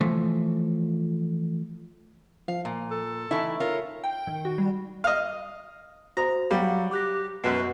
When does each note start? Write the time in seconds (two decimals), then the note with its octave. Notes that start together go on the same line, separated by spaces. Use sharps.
0.01 E3 F3 A3
2.48 F3 F5
2.65 A#2
2.91 A4
3.31 E3 A3 D#4 E4 A5 A#5
3.60 F4 A#4 C#5
4.04 G5
4.27 D#3
4.45 F#4
4.58 G3
5.04 D#5 F5
6.17 F#4 C5 A#5 D#6
6.51 F#3 G3 F5
6.91 G4 D6 F#6 A#6
7.44 F#2 B2 B4 C7